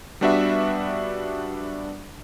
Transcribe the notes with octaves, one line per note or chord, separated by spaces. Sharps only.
G3 B3 D4 F#4 B4 E5